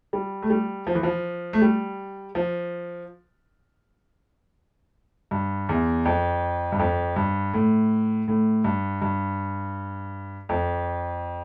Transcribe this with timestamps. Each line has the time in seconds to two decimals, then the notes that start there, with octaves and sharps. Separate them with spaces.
0.13 G3
0.43 A3
0.50 G3
0.87 F3
0.95 E3
1.03 F3
1.53 A3
1.62 G3
2.35 F3
5.31 G2
5.69 E2
6.05 F2
6.72 G2
6.79 F2
7.16 G2
7.54 A2
8.28 A2
8.64 G2
9.02 G2
10.49 F2